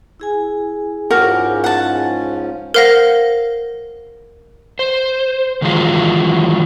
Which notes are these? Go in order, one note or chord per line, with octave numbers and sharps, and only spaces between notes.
E4 G#4 G#5
G#2 F3 C#4 F#4 G4 A#4
F#5 A5
A#4 C5 F5 F#5 A#6
C5
D#3 E3 F#3 G#3 F4